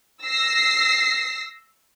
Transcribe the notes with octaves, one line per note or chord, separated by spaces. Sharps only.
E6 A#6 C7